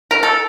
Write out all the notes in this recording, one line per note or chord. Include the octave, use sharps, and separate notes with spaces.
A#4
A4